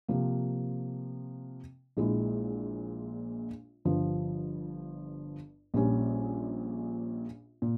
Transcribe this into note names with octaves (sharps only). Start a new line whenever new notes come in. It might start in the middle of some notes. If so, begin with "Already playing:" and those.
C3 F3 A#3
A#1 A#2 G#3 E4
G1 G2 F3
A#1 A#2 G3 C#4 G4
A#2